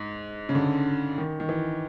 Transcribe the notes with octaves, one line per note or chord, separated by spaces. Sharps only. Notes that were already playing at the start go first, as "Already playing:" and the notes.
Already playing: G#2
C#3
D3
D#3
D#3
E3